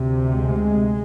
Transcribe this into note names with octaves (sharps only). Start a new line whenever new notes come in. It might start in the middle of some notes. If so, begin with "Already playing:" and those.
Already playing: D2 C3
G#3